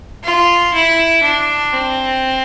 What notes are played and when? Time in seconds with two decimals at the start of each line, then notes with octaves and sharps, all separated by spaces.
0.24 F4
0.74 E4
1.23 D4
1.73 C4